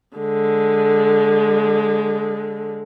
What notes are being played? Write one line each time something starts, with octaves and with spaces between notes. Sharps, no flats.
D3 G#3